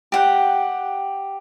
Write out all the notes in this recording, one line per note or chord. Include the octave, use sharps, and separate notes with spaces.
G4 F#5 G5